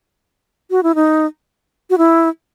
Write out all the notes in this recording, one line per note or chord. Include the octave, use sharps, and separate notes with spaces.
F#4
E4
D#4
F#4
E4